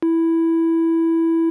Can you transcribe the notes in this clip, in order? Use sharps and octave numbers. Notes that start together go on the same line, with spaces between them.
E4